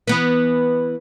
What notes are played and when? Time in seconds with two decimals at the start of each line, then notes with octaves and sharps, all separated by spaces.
0.07 E3 B3 B4